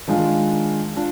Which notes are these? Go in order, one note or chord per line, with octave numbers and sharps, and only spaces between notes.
D#3 G#3 D4 F4
D4 F4